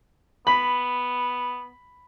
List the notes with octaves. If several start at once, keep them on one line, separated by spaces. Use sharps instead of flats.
B3 B5